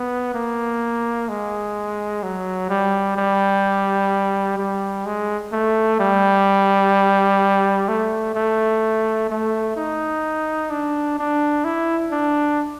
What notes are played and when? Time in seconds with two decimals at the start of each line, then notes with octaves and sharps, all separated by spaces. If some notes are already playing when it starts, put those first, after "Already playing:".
Already playing: B3
0.35 A#3
1.29 G#3
2.23 F#3
2.70 G3
3.17 G3
4.58 G3
5.06 G#3
5.53 A3
6.00 G3
7.88 A3
8.35 A3
9.30 A3
9.77 D#4
10.70 D4
11.18 D4
11.65 E4
12.12 D4